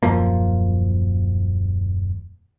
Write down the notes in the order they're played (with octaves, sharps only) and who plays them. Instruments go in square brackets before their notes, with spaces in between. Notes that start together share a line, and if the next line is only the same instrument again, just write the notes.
[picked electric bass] D#1 F#2 F3 A#3